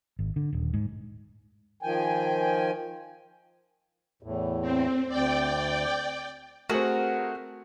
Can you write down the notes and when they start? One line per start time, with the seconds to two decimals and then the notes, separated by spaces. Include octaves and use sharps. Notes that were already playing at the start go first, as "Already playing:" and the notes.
0.19 G#1
0.36 D3
0.53 D#1
0.74 G#2
1.83 D#3 F3 G5 G#5
4.23 E2 A2
4.61 C4
5.09 D2 D5 G5
6.69 A3 C4 F#4 G#4 A#4